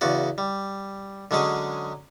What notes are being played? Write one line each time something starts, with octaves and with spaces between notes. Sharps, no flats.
E2 C#3 F#4 D5
G3
D3 F#3 G#3 C#4 G#4